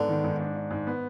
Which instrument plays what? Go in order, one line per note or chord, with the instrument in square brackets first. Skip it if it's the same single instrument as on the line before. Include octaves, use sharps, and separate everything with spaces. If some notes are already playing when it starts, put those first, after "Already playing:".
Already playing: [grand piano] G#2 B3 [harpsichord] D3
[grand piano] D#3
G#2
D4
D4
G#2
B3